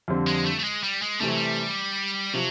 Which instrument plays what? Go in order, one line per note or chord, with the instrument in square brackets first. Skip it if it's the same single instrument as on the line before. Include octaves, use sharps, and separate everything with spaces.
[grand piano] F2 D3 G3 C4
[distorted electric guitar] G#3
A3
A3
G#3
G3
G#3
[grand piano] C3 E3 A3 [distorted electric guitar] G3
[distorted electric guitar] F#3
G3
[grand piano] C3 F3 [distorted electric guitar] F#3